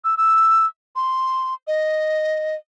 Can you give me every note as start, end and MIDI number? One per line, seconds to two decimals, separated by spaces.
0.04 0.15 88
0.17 0.66 88
0.96 1.54 84
1.67 2.55 75